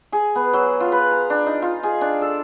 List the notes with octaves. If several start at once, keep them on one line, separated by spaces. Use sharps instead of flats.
G#4
B3
F#3
F4
B4
A#5
D4
D#4
F4
G#4
D4
A4